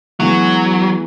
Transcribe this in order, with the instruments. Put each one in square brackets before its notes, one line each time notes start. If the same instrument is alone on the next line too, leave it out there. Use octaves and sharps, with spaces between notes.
[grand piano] E3 G#3 B3 [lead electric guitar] F#3